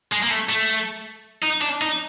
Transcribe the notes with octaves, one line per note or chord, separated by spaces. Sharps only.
G#3
A#3
A3
A3
D#4
D4
D#4